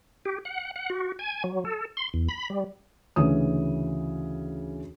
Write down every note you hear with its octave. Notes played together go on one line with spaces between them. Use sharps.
G4
F#5
F#5
F#4
G#5
F#3
A4
C6
E2
B5
G3
D2 C#3 E3 C#4 D#6